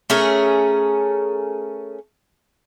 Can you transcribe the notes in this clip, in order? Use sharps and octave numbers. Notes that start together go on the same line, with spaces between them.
A3 C#4 G#4 A#4